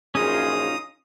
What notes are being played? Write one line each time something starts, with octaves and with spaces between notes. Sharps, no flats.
A#1 F#2 C#4 D#4 F4 G#4 D#6